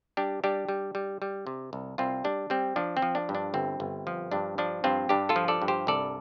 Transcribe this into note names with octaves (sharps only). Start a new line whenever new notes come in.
G3 D4 G4
G3 D4 G4
G3
G3
G3
C3
C2
C2 C4 F4
G3 D4
G3 C4
F3 D4
C4
F3
D4
G2
D4
G1 C4
G1
F3
G2 D4
F3 D4
G2 C4 F4
G2 D4 G4
F4 A4
F3
A4 D5
G2
G4 C5
C2 A4 D5